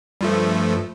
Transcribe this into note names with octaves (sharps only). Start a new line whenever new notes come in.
G2 F3 A3